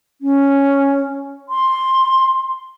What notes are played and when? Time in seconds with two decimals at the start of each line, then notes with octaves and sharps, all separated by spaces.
0.21 C#4
1.49 C6